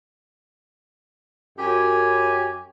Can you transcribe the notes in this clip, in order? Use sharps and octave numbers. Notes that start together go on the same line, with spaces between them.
F#2 G4 G#5